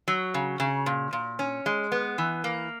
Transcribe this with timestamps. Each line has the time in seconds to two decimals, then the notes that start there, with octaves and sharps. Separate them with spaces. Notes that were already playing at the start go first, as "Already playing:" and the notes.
0.08 F#3
0.34 C#3
0.60 C#3
0.86 A#2
1.13 A#2
1.39 C#4
1.66 G#3
1.92 B3
2.18 E3
2.44 A#3